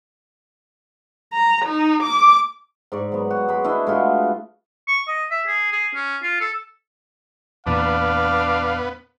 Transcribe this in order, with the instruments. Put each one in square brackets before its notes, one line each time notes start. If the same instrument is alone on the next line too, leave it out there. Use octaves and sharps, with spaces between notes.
[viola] A#5
D#4
D6
[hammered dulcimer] G#2 D5 C#6
F#3 B3
F#4
G#3 B5
D4 E4 F#4 D#5
G#3 A3 F4 F#4
[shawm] C#6
D#5
E5
G#4
G#4
C#4
F4
A4
[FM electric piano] E2 A#2 E3 [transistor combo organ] B3 [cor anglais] D4 [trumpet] F5